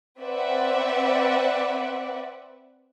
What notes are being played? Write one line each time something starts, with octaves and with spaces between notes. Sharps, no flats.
C4 B4 D5 E5 F#5